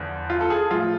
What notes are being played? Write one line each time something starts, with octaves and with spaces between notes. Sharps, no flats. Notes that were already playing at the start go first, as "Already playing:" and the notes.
Already playing: E2 D3 F3
F4
A4
G#4
A2 F3 F4